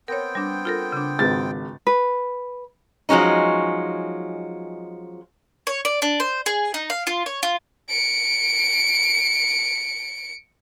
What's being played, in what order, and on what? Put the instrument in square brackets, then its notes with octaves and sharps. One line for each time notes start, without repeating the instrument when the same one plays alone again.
[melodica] B3 C4 G5 [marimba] A#4 C#5
[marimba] G3 D4
F4 A4 A#4
C#3 D4
[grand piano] G#1 G#2 A6 [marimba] F4 B4
[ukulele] B4
[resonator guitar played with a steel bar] F3 F#3 G#3 C#4 D#4
[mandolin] C#5
D5
D4
C5
G#4
D#4
F5
F4
C#5
F4
[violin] C#7 D7